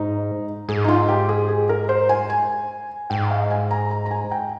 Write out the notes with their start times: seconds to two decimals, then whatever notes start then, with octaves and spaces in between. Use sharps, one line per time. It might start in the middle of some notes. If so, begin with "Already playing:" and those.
Already playing: G#2 D#4
0.69 G#2 G#4
0.84 D#4
0.88 F4
1.09 G4
1.29 G#4
1.49 G#4
1.69 A#4
1.89 C5
2.09 G#5
2.30 G#5
3.10 G#2 G5
3.31 F5
3.51 G#5
3.71 A#5
3.91 A#5
4.06 A#5
4.11 G#5
4.31 G5